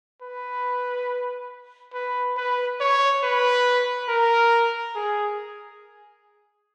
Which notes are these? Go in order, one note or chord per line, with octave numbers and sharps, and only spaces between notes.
B4
B4
B4
C#5
B4
A#4
G#4